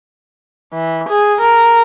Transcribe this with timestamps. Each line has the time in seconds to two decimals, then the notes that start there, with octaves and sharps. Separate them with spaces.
0.73 E3
1.09 G#4
1.41 A#4